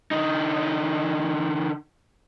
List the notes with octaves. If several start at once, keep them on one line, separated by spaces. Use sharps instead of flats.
D3 D#4